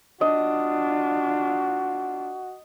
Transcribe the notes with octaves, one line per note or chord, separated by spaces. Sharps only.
D4 F4 F#4 D#5